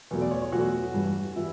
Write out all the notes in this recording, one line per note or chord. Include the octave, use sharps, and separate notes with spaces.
E2 B2 F#3 A3
D5
C#5
C#5
E2 B2 F#3 A3 F#4
G2 E3 G3
E3 G3 E4